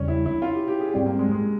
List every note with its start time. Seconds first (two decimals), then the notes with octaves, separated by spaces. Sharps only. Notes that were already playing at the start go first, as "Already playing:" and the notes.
Already playing: E2 C#3 G3 C#4
0.08 E4
0.26 E4
0.42 F4
0.55 G4
0.68 G4
0.80 G#4
0.93 G#2 G3 C4 G4
1.06 A#3
1.19 G#3
1.31 G#3